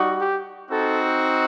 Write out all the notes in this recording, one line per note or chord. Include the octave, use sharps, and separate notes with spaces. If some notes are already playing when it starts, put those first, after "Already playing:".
Already playing: G3 D#4 F#4
G4
C4 D#4 F#4 A4